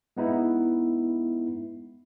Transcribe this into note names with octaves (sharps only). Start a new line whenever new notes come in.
G#3 B3 D#4 E4